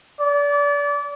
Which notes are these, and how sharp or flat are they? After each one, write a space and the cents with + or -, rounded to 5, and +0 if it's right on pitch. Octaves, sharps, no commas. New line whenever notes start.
D5 -30